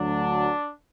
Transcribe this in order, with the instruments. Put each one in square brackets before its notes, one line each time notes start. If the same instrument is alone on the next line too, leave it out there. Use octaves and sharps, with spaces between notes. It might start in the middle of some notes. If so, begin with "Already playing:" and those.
Already playing: [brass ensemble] D2 D3 F#3 D4